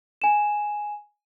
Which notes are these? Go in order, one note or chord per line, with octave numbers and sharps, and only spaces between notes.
G#5 E7